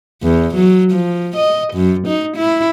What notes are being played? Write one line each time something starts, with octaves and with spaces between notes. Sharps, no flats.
E2
F#3
F3
D#5
F#2
D#4
E4